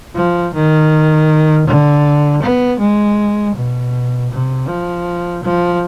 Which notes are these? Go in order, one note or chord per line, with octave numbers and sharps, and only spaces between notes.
F3
D#3
D3
B3
G#3
B2
C3
F3
F3